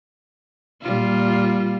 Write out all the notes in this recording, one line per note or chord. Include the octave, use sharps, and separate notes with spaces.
A#2 G3 F4